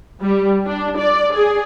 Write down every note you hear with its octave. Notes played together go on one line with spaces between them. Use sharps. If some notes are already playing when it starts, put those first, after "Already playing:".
G3
D4
D5
G#4